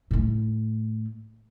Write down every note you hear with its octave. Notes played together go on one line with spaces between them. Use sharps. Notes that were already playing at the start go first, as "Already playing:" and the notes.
A2 A3